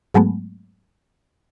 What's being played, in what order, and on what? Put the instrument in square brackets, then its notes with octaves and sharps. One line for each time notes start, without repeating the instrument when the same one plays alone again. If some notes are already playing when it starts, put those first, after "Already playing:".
[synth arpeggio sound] G#2 F#3 G#3 A3 B3